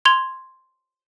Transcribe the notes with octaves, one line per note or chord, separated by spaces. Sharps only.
C6 G#6 F7 G7